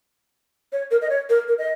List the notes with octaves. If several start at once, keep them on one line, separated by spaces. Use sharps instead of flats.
C#5
A#4
D#5
C#5
A#4
A#4
D#5